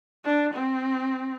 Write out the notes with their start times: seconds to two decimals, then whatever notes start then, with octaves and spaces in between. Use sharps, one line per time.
0.24 D4
0.54 C4